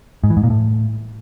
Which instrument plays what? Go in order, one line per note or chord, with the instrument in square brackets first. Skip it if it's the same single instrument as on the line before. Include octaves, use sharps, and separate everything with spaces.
[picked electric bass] G#2
E3
G#2
A#2
A2